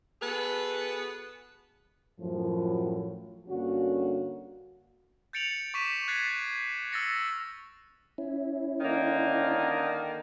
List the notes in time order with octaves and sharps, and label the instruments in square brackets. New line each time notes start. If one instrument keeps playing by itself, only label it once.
[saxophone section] B3 F#4 G#4 A4 B4
[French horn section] F#2 A2 F3
G2 D3 A#3 C#4 F#4
[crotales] G6 A6 C#7 D7 F7 F#7
C#6 D6 B6 D#7 E7
F#6 G#6 A6 C7 D#7
E6 F6 A6 A#6 C#7
[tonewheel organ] C#4 E4
[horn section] D3 D#3 A#3